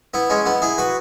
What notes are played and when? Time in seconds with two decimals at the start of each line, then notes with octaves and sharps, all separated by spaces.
0.14 B3 E4
0.30 G#3 C#4
0.45 B3 E4
0.62 E4 G#4
0.78 F#4 B4